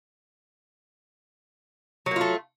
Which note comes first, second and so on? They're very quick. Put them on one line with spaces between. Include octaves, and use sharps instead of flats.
F#3 A#3 F4 A3